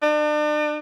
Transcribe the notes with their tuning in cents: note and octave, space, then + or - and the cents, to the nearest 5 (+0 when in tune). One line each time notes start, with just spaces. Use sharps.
D4 +40